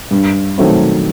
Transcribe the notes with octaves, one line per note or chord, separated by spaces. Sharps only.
G2
D#3 F#3 A3 C4